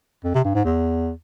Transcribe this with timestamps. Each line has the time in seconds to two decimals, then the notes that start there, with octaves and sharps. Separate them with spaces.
0.24 F2
0.34 C3
0.44 G2
0.55 G#2
0.65 E2